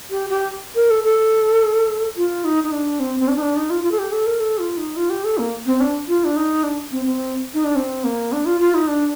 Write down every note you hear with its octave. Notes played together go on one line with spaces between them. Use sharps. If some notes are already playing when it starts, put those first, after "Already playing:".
G4
G4
A#4
A4
A4
F4
D#4
D#4
D4
C4
C4
D4
D#4
D4
D#4
F4
F4
A4
G4
A4
A#4
A4
F4
D#4
F4
G4
A4
A#3
C4
D4
F4
D4
D#4
D4
C4
C4
D#4
D4
C4
A#3
D4
F4
F4
D#4
D4